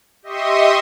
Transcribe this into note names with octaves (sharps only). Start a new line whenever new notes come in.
G4 D#5 E5 C6 C#6 D#6